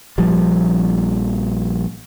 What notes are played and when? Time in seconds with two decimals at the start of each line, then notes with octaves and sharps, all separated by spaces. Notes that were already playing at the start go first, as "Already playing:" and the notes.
0.18 A#1 F3 G3